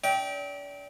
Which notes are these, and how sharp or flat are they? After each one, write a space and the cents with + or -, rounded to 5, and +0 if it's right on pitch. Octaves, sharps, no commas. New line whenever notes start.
D4 -40 E5 -45 G5 -5